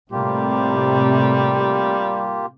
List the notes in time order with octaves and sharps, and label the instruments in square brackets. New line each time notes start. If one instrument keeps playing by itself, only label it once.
[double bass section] A2 C3 A3 [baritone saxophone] G3 [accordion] A#3 F4 G4